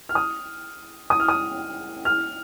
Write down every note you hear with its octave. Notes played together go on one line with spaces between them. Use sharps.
F6
D#6
D#6
F6
D#6
F6